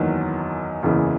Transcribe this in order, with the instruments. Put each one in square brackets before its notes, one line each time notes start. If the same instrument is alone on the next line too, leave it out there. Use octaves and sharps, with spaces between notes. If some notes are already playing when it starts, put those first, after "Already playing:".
Already playing: [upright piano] F#1 E2 D#3 F#3
F#1 E2 C#3 E3